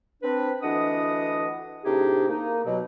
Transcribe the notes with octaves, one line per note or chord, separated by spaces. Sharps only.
C4 D4 B4
D2 E3 D4 D#5 F#5 D#6
A2 C3 D4 D#4 G4 G#4
A#3 D#4
B2 F#3